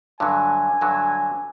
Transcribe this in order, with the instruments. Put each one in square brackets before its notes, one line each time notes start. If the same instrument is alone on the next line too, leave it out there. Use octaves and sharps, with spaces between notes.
[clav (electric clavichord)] G2 D3 F#3 [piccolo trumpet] G#5
[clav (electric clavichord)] G2 D3 F#3